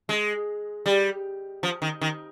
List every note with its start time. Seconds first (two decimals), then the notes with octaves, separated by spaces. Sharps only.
0.09 G#3
0.86 G3
1.63 F3
1.82 D#3
2.01 D#3